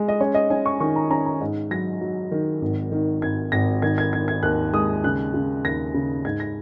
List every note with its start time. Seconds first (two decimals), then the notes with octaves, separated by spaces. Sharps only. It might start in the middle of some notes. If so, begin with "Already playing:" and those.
Already playing: G#3
0.08 D#5
0.21 C#4 C#5
0.34 D#5
0.50 C#4 G#5
0.66 C#6
0.80 D#3 C#6
0.96 A#5
1.10 C#4 A#5
1.26 A#5
1.41 G#2
1.71 F#3 A#6
2.01 F#3
2.31 D#3
2.62 G#1
2.92 D#3
3.22 G#1 G#6
3.52 G#1 A#6
3.82 D#3 G#6
3.98 G#6
4.13 D#3 G#6
4.28 G#6
4.43 D#2 F#6
4.74 G#3 D#6
5.04 C#3 F#6
5.34 C#3
5.64 D#2 A#6
5.94 C#3
6.25 G#2 G#6
6.40 A#6